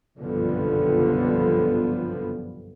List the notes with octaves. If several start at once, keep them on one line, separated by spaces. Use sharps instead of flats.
F#1 B1 G2 D3 F3 B3